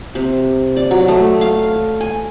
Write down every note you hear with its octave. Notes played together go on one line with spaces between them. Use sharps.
C3
D5
F#3
A3
F5
G#5